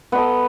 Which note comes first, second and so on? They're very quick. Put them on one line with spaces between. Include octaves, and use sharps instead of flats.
B3 D#5 A4